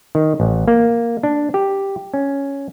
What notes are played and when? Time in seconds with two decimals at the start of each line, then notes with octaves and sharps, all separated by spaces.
0.15 D#3
0.40 A1
0.68 A#3
1.23 D4
1.54 G4
2.14 C#4